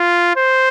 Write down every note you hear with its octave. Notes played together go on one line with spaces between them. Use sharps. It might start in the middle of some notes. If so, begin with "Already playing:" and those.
Already playing: F4
C5